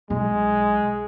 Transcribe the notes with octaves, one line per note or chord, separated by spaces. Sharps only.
B1 G#3